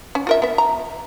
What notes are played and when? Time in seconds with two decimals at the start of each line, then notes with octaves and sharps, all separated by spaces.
0.15 C#4
0.27 F4 A#4 E5
0.42 B3 E5
0.58 A#5